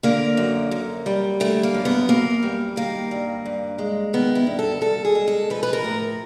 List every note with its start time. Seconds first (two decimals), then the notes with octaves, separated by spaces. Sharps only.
0.03 D3 A#3
0.37 F#2
0.71 F#2
1.06 G3
1.40 D3 A3
1.63 A#3
1.74 F#2
1.85 B3
2.08 F#2 A#3
2.43 G3
2.76 D#3 A#3
3.11 G2
3.46 G2
3.78 G#3
4.13 D#3 B3
4.35 E4
4.47 G2
4.59 A4
4.81 G2 A4
5.05 G#4
5.15 G#3
5.28 A4
5.50 F3 B4
5.63 B4
5.73 A#4
5.84 A2